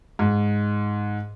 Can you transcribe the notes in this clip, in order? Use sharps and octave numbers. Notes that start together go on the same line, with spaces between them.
G#2